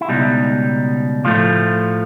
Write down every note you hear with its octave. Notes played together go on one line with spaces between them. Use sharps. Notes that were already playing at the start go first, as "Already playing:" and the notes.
E4
C#2 B2 G3 D#4
A2 F3 A3 F4